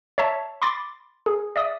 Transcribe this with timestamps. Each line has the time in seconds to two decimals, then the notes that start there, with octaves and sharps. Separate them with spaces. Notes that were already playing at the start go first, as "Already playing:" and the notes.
0.18 C#5 E5 A5
0.62 B5 C6 D6 A6
1.26 G#4
1.56 D5 E5 D#6